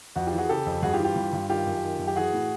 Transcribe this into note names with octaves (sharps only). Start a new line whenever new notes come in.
F2 F#4
F4 G4
E3
F#4 G#4
C#3 G4 A4
F2
G2 F#4 G#4
F4 G4
E3
F4 G4
G2
G2
D#3 F4 G4
F#2
D#3
F#2
G4
E3 F#4 G#4
A2